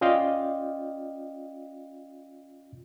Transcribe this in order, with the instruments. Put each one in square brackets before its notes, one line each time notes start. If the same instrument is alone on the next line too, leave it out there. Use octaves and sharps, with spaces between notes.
[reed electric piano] C#4 F4 D5 D#5 F5 G5